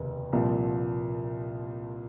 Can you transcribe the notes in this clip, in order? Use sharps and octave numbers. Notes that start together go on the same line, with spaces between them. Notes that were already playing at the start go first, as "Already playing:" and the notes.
Already playing: F1 D#2 C#3
C2 A#2 F3